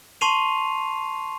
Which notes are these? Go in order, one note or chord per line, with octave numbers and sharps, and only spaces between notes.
A5 C6 C#6 C7 D#7 F7